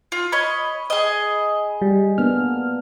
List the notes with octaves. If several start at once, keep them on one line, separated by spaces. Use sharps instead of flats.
F4
C#5 D#5 B5
G#4 D#5
G3
A#3 B3 D4 F6